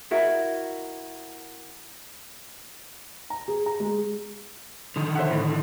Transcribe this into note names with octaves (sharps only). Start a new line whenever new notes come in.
E4 F#4 A#4 D#5
A#5
G#4
A#5
G#3
D3 D#3
C5 E5 F#5
A2